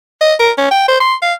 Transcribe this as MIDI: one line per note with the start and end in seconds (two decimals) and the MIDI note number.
0.21 0.34 75
0.39 0.51 70
0.58 0.71 61
0.71 0.85 79
0.88 0.97 72
1.00 1.15 84
1.22 1.33 77